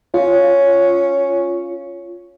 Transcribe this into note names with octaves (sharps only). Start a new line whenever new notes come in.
C#4 F4